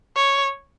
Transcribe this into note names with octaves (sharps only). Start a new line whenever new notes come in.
C#5